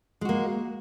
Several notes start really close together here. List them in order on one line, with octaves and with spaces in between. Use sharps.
G#3 F#4 A#3